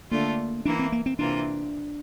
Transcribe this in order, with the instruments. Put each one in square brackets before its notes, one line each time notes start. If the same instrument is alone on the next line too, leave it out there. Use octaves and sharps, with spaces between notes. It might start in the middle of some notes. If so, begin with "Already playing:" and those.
[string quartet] D3 A3 D4 F4 [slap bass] A#3
[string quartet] E3 A#3 E4 [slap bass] D4
[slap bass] C4
A#3
C4
[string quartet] C3 E3 A#3 F4 [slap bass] D4